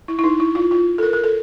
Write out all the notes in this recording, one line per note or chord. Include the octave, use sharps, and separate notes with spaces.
E4
E4
D#4
E4
F4
F4
A4
A#4
A#4
A4